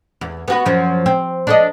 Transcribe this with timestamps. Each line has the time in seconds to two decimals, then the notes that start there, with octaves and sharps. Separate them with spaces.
0.21 E2
0.48 B3 F#4 B4
0.65 F#2 F3 F#3
1.06 C4
1.47 D4 A4 D#5